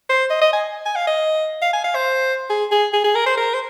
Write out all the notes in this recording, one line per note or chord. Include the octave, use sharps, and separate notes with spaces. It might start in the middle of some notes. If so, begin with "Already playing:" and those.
C5
D#5
D#5
G#5
G#5
F5
D#5
F5
G#5
F5
C5
G#4
G#4
G#4
G#4
A#4
C5
A#4
C5